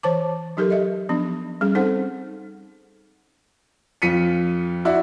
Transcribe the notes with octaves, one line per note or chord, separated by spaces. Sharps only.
E3 C5 A5 D6
F#3 D#4 G4 A4 A#4
D#5 E5
F3 B3 D4
G3 C#4 G#4
C4 D#4 A4 C5 F#5
F2 F4 B6 C#7 D#7
E4 F#4 D5 E5 F#5